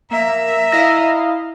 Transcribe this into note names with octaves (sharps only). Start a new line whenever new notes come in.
A#3 E5 A#5
E4 D#5 F5 A#6